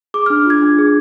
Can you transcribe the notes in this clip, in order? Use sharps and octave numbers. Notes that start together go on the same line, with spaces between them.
G#4 D6
F6
D4
F4 G#6
D4
G#4